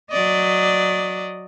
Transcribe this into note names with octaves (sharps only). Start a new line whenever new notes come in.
F#3 D5 D#5